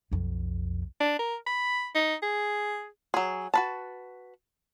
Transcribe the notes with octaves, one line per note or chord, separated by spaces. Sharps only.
B1 F2
D4
A#4
B5
D#4
G#4
F#3 G#4
F#4 B4 A5